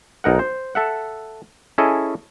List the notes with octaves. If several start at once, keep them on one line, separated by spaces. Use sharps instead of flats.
B1 D#4 A#4 F#5
C5
A4 E5 F#5
C#4 E4 G#4 A4 D#5